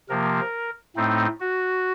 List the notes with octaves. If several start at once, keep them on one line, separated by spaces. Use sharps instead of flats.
C3 F3 A#3 A#4
A2 A3 C4 D#4
F#4